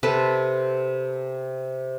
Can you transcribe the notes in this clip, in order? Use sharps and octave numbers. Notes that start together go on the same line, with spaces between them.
C3 A4 B4 C5